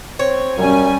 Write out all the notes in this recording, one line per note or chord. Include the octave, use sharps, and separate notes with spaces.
C4 C#5
F#2 G3 C#4 G#5